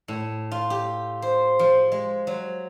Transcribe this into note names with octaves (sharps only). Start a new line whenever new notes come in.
A2
F4
G4
C5
F3
G#3
F#3